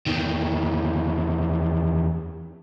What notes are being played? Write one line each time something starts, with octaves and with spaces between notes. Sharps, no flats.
E2 D#3